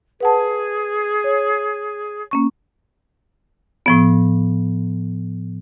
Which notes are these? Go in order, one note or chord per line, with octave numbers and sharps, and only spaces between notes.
G#4 B4 F#5 A5
C#5
A#3 C#4 C#6
A2 F3 B3